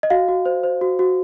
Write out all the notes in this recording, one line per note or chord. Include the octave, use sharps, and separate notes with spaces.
D#5
F#4 F5
F#4
C5
C5
F#4
F#4